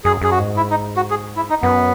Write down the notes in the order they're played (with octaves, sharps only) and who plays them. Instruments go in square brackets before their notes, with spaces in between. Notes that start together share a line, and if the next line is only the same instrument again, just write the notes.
[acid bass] F#2 [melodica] G#4
[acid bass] F#2 [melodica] G#4
[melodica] F#4
[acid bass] G#2
[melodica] E4
D#4
F#4
G#4
E4
D#4
[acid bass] F#2 [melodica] B3